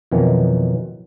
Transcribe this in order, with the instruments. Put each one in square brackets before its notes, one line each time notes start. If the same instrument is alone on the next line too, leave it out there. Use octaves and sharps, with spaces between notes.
[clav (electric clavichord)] F2 B2 D#3 E3 F#3